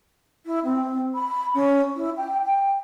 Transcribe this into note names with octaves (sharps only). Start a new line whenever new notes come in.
E4
C4
B5
C#4
E4
G5
G5